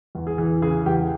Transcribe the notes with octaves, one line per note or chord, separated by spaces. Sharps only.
E2
G#4
E3
C#3 G#4
E2 G4